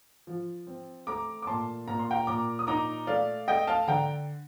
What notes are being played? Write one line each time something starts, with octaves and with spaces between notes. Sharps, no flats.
F3
C4
A3 A#5 D6
D6
A#2 A5 C6
A#2 A#5
C6
G5 A#5
A#2 A#5 D6
D#6
D#4 A#5 D6
A3 D5 F5
A3 D#5 G5
F5 A5
D3 G5 A#5